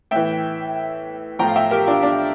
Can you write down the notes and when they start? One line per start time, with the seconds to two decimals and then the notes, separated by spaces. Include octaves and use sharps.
0.11 A2 E3 E5 G5
1.39 A2 F3 G5 A#5
1.48 F5
1.56 E5 G5
1.71 G4 A#4
1.87 D4 F4
2.03 D4